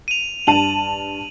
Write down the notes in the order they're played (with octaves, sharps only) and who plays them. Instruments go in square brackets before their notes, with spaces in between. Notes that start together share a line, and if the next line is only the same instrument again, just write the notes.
[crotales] D#7 F7
[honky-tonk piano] G2 A5 D#7 [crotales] F#7